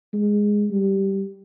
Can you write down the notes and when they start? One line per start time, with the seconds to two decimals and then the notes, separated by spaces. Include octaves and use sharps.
0.13 G#3
0.70 G3